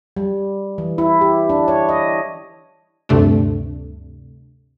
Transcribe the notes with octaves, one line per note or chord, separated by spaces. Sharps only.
G3
E3
E4
G4
D4
C#5
D#5
D2 G2 C3 A3 D4